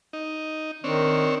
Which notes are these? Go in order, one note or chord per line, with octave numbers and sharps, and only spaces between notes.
D#4
D#3 C4 D4 C#5